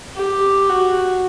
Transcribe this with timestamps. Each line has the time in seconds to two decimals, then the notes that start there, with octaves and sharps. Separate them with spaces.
0.15 G4
0.69 F#4